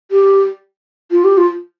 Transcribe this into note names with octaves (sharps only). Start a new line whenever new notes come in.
G4
F4
G4
F4